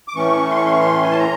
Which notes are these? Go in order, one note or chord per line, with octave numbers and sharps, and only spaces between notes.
D6
A2 E3 A3 C#4 C#6
C6
C#6
C6
C#6
C6
G#5
A5
A#5